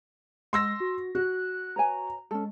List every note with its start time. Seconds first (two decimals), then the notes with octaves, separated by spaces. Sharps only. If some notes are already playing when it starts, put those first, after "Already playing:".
0.53 G#3 C6 E6 A#6
0.80 F#4
1.15 F#4 F#6
1.76 B4 C#5 G#5 A#5
2.31 G#3 C#4 A4